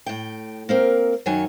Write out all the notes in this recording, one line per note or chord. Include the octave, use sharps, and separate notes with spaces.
A2 G5
A#3 C4 A#4
F#2 D#3 F#3 C#5 G#5